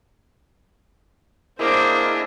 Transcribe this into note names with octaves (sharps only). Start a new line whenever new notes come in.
A#3 D4 E4 G#4 A#4 C5 D#5 D6